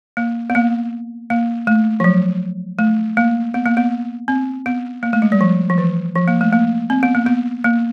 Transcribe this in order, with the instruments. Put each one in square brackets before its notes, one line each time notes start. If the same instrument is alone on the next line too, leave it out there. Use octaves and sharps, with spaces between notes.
[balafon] A#3
B3
A#3
A#3
A3
F3
F#3
A3
A#3
B3
A#3
B3
C4
B3
A#3
A3
G#3
G3
F3
F3
E3
F3
A#3
A3
A#3
C4
B3
A#3
B3
A#3